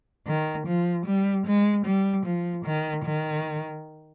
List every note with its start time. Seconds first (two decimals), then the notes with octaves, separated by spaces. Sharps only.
0.27 D#3
0.67 F3
1.06 G3
1.46 G#3
1.86 G3
2.26 F3
2.65 D#3
3.05 D#3